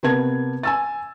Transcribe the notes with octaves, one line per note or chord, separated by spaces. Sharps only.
C3 B3 A#4 A5 G#6
G#5 E6 A6